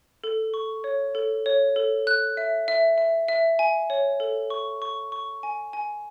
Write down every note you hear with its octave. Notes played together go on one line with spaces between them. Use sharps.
A4
C#6
C#5
A4
C#5
A4
F#6
E5
E5
E5
E5
G#5
C#5
A4
C#6
C#6
C#6
G#5
G#5